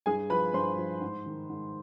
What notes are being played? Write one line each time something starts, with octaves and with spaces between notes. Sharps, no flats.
G2 G#4 G#5
F3 B4 B5
G2 C5 C6
F3
G#2
D#3
G#2